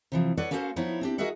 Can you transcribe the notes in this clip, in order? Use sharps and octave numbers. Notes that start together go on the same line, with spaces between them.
C3 E3 F3
A4 B4 C#5 D5 F#5
A#3 C#4 F#4 A4 C5 F5
F3 B3 D#4 E4 C#5
C4 D4 G4
F#4 G#4 A#4 D#5 E5 F#5